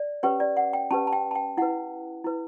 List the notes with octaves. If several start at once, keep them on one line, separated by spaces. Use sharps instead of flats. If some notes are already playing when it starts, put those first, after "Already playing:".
Already playing: D5
C#4 G4 B4 C#5
D5
F#5
G5
C#4 G4 B4 A5
A5
G5
A5
G5
E4 B4 F#5
E4 B4